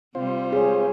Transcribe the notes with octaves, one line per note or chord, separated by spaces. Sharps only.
C3 G3 C4 F4 C5
G#4 C#5